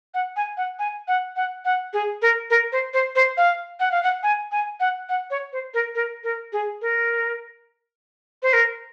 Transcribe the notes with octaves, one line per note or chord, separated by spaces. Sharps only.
F#5
G#5
F#5
G#5
F#5
F#5
F#5
G#4
A#4
A#4
C5
C5
C5
F5
F#5
F5
F#5
G#5
G#5
F#5
F#5
C#5
C5
A#4
A#4
A#4
G#4
A#4
C5
A#4